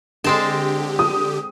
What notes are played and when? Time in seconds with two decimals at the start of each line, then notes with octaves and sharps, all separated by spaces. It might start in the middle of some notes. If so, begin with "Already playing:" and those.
0.24 D3 G#3 C4 G4 A5
0.99 D#6